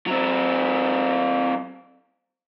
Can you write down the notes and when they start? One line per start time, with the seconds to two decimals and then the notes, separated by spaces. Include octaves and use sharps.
0.07 F#3 C4